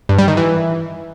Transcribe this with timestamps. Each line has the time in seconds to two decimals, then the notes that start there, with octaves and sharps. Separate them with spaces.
0.09 G2
0.19 G3
0.28 D#3
0.37 E3